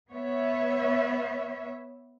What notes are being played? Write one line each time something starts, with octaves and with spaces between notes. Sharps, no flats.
B3 C#5 E5